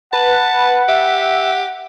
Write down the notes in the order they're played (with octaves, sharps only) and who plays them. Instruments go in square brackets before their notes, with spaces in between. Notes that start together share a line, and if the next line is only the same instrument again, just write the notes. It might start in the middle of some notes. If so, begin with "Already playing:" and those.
[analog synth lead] B4 [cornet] F#5 [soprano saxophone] A5
[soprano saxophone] G4 [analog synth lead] E5